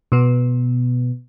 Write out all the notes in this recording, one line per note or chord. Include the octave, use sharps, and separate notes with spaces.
B2 B3